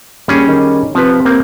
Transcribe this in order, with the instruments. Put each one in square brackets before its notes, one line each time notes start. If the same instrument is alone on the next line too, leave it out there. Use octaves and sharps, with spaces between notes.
[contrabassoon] D#2 [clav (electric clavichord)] G3 C#4 G#4
[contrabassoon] D#3
[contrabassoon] C3 [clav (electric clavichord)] F3 B4
[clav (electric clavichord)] A#3 C4